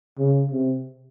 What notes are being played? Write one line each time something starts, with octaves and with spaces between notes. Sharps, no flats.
C#3
C3